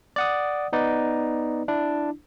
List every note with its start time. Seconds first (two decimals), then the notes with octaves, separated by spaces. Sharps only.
0.16 D5 F#5 D#6
0.73 B3 D#4 B4 D5
1.68 D4 E4